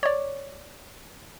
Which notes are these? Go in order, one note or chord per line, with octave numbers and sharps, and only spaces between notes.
C#5 D5